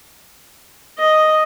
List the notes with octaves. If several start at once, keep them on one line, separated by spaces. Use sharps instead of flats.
D#5